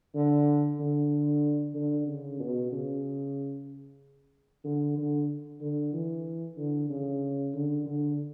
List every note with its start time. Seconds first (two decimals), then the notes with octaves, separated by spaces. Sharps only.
0.15 D3
0.79 D3
1.75 D3
2.07 C#3
2.40 B2
2.72 C#3
4.64 D3
4.97 D3
5.61 D3
5.93 E3
6.57 D3
6.90 C#3
7.54 D3
7.86 D3